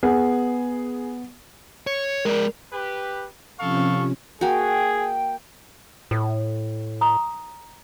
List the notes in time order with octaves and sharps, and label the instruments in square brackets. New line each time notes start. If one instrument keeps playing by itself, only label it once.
[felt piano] B3 [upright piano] G#4
[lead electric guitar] C#5 [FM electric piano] C#7
[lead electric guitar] G#3 D5 [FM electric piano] A#4
[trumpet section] G4 B4
[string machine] C3 F3 C#4 [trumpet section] A4 F5 C#6
[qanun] A#3 F#4 [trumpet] G#4 [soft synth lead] G5
[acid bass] A2 [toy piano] A4
[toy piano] A#5 D#6